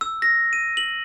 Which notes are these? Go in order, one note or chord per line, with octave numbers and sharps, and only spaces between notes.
E6
A#6
D#7
F#7